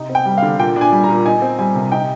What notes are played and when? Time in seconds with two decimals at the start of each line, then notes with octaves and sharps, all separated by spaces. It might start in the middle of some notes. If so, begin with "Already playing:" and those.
Already playing: C3 D#4
0.09 C4
0.15 G5
0.26 G3
0.38 F5
0.43 D3
0.59 A#2 G5
0.76 D4
0.81 G#5
0.92 G3
1.04 A#5
1.09 A#2
1.25 D#4 G#5
1.42 C4
1.59 G3 G#5
1.75 C3
1.92 D#4 G5